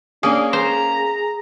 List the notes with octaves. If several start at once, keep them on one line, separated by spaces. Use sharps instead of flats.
A#3 C#4 D4 G#4
G#4 C5 A#5